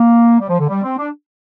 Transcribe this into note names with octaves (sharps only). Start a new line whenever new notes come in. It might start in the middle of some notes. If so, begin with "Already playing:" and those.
Already playing: A#3
G3
F3
D3
G3
C4
D4